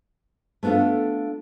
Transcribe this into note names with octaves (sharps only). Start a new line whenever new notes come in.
A3 B3 D4 F4 A4